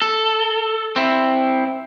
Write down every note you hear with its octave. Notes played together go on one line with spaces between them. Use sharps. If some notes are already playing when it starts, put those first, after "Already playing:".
A4
C4 E4